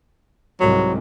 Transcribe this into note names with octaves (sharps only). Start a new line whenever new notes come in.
C2 G#2 F#3